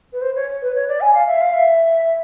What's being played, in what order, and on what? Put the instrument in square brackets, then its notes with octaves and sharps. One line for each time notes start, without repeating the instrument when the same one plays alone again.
[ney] B4
C5
C#5
B4
C#5
D5
G#5
F5
E5
F5
E5